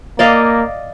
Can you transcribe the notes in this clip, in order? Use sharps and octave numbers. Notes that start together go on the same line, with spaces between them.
A#3 D5 D#5 F5